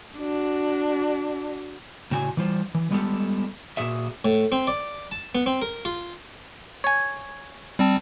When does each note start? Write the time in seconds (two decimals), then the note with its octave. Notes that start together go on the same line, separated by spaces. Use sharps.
0.17 D4 F#4
2.11 A2 C#3 F#4 G#5
2.37 E3 G3 F4 C5
2.75 E3
2.91 G3 G#3 B3 F4 G4 A4
3.77 A#2 F3 F#4 G#4 E5
4.25 A2
4.52 C4
4.67 D5
5.12 A5
5.35 B3
5.46 C4
5.62 A#4
5.85 F4
6.84 C#5 G#5
7.79 G3 C4 A5